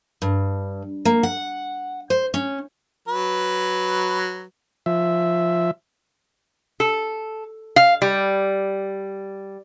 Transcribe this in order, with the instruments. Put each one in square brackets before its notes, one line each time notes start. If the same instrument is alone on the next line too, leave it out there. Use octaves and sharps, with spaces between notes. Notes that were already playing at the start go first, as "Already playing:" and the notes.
[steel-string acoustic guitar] G2
A#3
F#5
C5
C#4
[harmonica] F#3 B4
[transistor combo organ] F3 E5
[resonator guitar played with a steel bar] A4
F5
G3